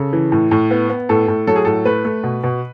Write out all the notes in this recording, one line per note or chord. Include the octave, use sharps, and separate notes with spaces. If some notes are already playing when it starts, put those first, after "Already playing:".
Already playing: C#3 A4
E3
A2
A2
B3
B3
A2 A4
A2
F#3 A4
G#4
A2 A4
A3 B4
A3
B2
B2